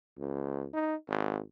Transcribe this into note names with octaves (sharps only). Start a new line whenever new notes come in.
C#2
D#4
G#1